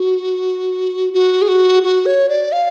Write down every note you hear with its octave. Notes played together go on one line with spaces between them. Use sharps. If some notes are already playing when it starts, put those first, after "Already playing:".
Already playing: F#4
F#4
G#4
F#4
F#4
C#5
D5
F5